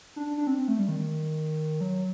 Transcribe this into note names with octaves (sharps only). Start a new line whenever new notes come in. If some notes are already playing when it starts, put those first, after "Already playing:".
D4
D4
D4
C4
C4
A3
G3
D#3
D#3
F#3